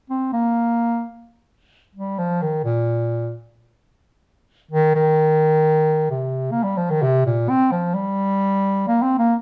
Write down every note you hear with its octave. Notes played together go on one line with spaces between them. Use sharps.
C4
A#3
G3
F3
D#3
A#2
D#3
D#3
C3
A#3
G3
F3
D#3
C3
A#2
C4
F3
G3
A#3
C4
A#3